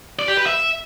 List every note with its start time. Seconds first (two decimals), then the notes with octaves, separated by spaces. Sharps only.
0.19 D5
0.28 G4
0.37 B4
0.46 E5